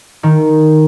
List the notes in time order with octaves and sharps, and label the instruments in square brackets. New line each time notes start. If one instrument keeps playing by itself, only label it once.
[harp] D#3